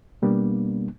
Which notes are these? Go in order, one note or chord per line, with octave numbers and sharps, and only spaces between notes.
B2 G3 A#3 B3 D4